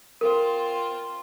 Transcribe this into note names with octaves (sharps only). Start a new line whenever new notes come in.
C4 F4 A#4